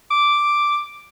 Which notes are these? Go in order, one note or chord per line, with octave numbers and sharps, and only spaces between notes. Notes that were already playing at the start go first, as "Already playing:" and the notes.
D6